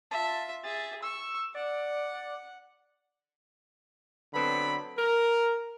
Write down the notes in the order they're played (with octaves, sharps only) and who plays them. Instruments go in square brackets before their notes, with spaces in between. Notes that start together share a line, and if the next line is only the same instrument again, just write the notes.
[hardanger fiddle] F4 E5 [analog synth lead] A5
[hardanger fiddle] G#4 E5 [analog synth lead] A6
[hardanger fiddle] C#6 [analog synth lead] E6
[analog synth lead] D5 [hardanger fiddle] F#5
[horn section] D3 F#3 B3 C4 B5
A#4